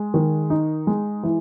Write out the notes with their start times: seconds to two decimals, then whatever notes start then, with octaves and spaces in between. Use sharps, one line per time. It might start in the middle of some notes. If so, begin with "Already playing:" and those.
Already playing: G#3
0.14 D#3
0.50 D#4
0.87 G#3
1.23 E3